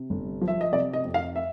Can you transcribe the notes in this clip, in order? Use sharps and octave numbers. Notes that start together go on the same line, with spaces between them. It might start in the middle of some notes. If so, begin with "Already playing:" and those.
Already playing: C3
G1
F3
E5
D#5
C3 D5
D#5
F2
F5
E5